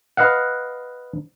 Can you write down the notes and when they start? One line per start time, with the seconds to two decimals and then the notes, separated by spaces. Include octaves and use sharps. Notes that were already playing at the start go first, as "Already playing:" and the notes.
0.17 B4 D#5 F5 F#5